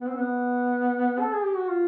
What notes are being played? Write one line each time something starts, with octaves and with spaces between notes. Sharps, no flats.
B3
C4
B3
A4
G#4
G4
F#4
F4